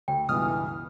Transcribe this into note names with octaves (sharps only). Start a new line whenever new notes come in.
D2 G5
C#2 G2 B2 E3 D#6 F6